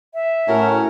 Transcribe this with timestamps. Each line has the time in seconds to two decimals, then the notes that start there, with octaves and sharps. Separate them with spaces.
0.14 E5
0.47 A2 C#4 F#4 A#4